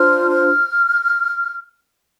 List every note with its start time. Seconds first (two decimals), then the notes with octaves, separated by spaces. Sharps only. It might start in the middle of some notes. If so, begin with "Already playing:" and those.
Already playing: D4 F4 C5 F6
0.31 F6